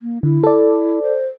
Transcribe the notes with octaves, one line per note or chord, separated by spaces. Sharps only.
A#3
D3 E4
A4 D5
C5